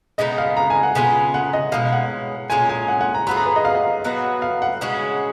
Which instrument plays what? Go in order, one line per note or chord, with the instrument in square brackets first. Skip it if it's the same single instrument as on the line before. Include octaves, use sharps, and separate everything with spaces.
[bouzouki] C#3 G#3 B3 D#4 [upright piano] D#5
[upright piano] F5
A#5
G#5
F#5
[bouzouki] C#3 G#3 B3 F4 [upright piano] G#5
[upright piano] F#5
D#5
[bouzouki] B2 G#3 C#4 [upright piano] F5
[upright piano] F#5
[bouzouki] A#2 G#3 C#4 F4 [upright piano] G#5
[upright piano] G#5
F#5
F#5
A#5
[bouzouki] F#3 B3 F4 G#4 [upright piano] B5
[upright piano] A#5
B4
D#5
F5
D#5
[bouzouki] F#3 B3 F#4 B4
[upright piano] F5
F#5
[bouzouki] C#3 G#3 C#4 F#4